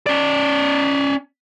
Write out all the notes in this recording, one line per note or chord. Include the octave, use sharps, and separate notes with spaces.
C#4 D5